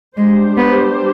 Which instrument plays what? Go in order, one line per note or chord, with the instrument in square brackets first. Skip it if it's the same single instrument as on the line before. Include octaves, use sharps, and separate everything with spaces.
[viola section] G3 D4 G4 C5 [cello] G#3
[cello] B3